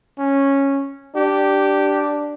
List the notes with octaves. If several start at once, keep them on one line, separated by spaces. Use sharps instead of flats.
C#4
D4 G4